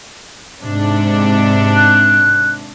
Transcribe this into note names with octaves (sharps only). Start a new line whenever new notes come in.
G#2 C3 D4
F#6